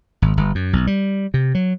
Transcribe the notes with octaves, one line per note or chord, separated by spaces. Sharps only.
G#1
G1
F#2
B1
G3
C3
F#3